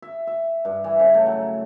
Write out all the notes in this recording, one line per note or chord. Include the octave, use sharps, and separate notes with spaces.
E5
E5
G2
E3
C#3
A3
F#3